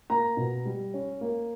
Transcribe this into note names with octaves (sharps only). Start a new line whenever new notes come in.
A#3 A#5
B2
G3
C#4
A#3